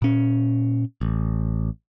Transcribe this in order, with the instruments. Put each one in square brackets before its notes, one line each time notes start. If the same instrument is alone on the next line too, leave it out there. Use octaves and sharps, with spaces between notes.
[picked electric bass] A#2 C#4
A1